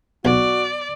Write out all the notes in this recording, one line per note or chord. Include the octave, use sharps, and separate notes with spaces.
B1 F#4 D5